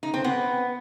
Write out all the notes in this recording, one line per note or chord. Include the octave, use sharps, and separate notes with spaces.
D#4
C4
B3